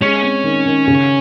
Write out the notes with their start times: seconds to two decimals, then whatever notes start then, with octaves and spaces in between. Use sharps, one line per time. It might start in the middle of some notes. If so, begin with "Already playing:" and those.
0.01 G#3 C#4
0.23 C4
0.44 D#3
0.66 D#3
0.88 C#3